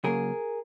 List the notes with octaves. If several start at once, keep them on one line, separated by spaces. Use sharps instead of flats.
C#3 F#3 A#3 G#4 A#4